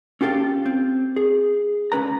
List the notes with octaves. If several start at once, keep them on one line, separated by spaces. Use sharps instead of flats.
C#4 F4 G4 A4 F5
C4
G#4
C#2 C#4 B4 A#5